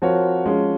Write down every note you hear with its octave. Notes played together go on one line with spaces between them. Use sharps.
F3 C4 F#4 A#4 C#5
F3 G#3 C#4